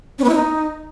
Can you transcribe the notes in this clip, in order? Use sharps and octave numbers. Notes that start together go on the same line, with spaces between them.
C#4
B3
E4
D#4